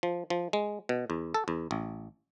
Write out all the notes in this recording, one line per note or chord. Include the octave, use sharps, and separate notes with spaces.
F3
F3
G#3
B2
E2
A4
E2
A1